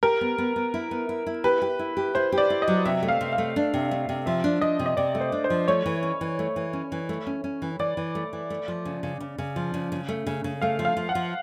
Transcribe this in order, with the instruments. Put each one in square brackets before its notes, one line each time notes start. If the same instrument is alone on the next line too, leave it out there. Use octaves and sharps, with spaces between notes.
[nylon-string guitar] G4 [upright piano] A#4
[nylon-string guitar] B3
B3
B3
E4
B3
E4
E4
[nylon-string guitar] G4 [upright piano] B4
[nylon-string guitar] G4
E4
G4
[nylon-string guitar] E4 [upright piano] C5
[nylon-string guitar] G4
[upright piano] D5
[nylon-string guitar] E4
[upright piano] D#5
[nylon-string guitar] F#3
[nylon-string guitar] C3 [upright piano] E5
[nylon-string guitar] A3
[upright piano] F5
[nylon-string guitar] C3
[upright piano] F5
[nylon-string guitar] A3
D4
C3
A3
C3
[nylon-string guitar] F3 [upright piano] E5
[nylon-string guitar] D4
[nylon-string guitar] F3 [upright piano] D#5
[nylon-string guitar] C3
[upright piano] D#5
[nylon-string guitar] C3 [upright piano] D5
[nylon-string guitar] A3
[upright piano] C5
[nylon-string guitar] D4
[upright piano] C5
[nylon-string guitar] F3
[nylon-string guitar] A3 [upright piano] C#5
[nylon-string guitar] E3
C#4
E3
A3
E3
C#4
E3
A3
C#4
C#4
E3
[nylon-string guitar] E3 [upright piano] D5
[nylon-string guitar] E3
A3
E3
A3
F3
C#3
C#3
C#3
C#3
F3
C#3
C#3
A3
C#3
C#3
[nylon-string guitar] A3 [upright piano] F5
[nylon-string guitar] F3
[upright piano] F5
[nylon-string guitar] F3
[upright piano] F#5
[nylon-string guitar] F3